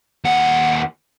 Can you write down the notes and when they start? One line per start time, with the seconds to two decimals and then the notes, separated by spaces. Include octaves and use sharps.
0.25 D#2 F#5